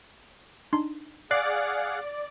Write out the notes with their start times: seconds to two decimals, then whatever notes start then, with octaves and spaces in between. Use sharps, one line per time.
0.73 D4 D#4 C6
1.31 G#4 D5 F5 F#5 F#6 C7